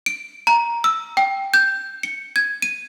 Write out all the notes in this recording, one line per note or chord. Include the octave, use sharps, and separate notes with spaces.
D7
A#5
E6
G5
G6
C#7
G#6
D#7